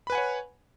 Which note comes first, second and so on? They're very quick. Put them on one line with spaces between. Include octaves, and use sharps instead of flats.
B5 B4 G#5 F#5 C#5